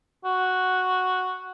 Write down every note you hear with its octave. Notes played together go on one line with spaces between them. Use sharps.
F#4